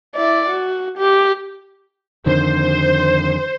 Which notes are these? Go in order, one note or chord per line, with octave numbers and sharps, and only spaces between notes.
E4 D5
F#4
G4
F2 D3 D#3 C5